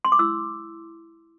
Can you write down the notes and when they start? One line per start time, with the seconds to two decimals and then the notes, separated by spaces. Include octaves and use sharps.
0.05 C6
0.12 D6
0.19 E4 E6